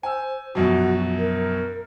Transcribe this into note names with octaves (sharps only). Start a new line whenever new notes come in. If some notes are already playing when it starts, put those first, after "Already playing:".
C5 G#5 E6
A#1 F#2 B2 F#4
A#4